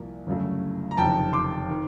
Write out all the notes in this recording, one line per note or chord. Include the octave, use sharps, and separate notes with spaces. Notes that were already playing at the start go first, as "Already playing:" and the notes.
Already playing: C2 A#2 F3 A#3
G1 F#2 C#3 F#3 A3
A#5
F#1 F2 C3 D#3 G5 A5
C6 D6
D#3